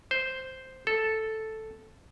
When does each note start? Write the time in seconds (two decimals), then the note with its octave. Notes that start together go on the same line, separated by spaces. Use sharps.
0.11 C5
0.87 A4